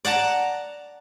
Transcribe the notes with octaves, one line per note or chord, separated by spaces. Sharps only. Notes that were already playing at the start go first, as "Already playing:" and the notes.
D5 F#5 A5 A#5